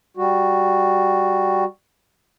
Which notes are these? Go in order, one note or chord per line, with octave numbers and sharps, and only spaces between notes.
G3 F#4